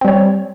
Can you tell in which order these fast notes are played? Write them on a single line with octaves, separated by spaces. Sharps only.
C4 G3 C#5